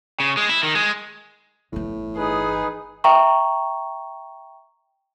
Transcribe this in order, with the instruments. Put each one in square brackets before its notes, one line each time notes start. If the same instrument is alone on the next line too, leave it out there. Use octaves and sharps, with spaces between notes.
[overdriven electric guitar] C#3
G#3
E4
D#3
G#3
[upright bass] G1 E3 [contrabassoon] A2
[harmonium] D#4 B4 [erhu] G#4
[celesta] E5 G5 A#5 C#6